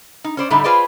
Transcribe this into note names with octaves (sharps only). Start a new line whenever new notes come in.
D#4
C#4 C5 D5
A2 D3 G3 A3 D#4
F4 G#4 B4 C5 D5 D#5